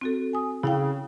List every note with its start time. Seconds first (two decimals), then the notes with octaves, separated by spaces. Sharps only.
0.01 C4 F#4 A4
0.33 G#5 D#6
0.63 C#3 E4 F5 G5